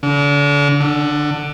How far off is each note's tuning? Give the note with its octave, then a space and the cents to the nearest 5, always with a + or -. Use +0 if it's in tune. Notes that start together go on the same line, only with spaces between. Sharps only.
D3 -35
D3 +15